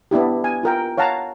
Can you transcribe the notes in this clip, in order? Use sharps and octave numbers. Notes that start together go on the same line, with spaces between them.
B3 D4 E4 G4
G#5
F4 A#4 G5
C#5 F5 F#5 A5 A#5